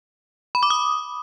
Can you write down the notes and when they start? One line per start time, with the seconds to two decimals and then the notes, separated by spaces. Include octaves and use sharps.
0.55 B5
0.63 D6
0.70 D#6